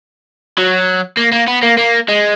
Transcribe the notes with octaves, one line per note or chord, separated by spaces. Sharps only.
F#3
A#3
A#3
B3
A#3
A#3
G#3